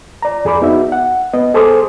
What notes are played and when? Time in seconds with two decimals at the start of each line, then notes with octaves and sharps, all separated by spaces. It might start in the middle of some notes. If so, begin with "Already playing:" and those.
0.22 D5 A#5
0.45 F2 G#4 D5 B5 D6
0.62 B3 D#4 F#4 E5
0.92 F#5
1.33 B3 D#5
1.54 G#4 A4 C5 C6 D6 D#6